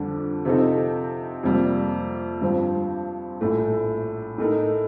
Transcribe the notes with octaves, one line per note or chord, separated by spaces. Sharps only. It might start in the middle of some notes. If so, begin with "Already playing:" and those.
Already playing: F2 D3 G3 D4
C3 F3 C4 D#4 A4
F2 C3 G3 A#3
G2 F3 C4
A#1 A2 A3
A2 A3 D#4 A#4